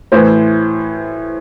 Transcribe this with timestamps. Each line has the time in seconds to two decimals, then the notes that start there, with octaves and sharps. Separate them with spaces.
0.12 A2 E3 C5